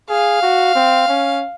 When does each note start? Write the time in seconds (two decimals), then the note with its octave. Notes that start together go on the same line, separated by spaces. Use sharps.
0.09 G#4 F5
0.42 F#4
0.75 C4
1.08 C#4